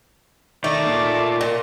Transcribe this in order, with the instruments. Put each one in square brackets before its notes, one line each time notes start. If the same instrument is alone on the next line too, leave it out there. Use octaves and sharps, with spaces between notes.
[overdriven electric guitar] D#3 D#4 [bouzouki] A3 [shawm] D5
[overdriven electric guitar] A#2 A#3
[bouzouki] A#2